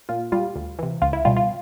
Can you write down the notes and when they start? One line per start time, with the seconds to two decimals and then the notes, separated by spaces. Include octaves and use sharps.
0.09 A#2 F4
0.32 G3 F4
0.55 D2
0.79 C3 E3
1.02 C#2 F4
1.13 E4
1.25 B2 G3 F4
1.37 F4